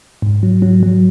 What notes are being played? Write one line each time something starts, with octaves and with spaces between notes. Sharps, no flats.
G#2
F#3
F#3
F#3